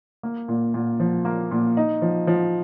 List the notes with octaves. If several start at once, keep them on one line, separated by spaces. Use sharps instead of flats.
A#3
A#2
A#2
F3
A#3
A#2
D#4
F3
F3